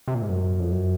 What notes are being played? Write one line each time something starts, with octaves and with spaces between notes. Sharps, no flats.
C3
A#2
G#2
F#2
F2
F#2